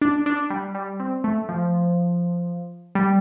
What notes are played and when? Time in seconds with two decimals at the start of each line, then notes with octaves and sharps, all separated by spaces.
0.01 D4
0.26 D4
0.50 G3
0.75 G3
1.00 C4
1.24 A3
1.49 F3
2.95 G3